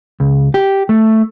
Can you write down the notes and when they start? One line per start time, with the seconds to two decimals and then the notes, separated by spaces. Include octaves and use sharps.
0.20 C#2
0.54 G4
0.89 A3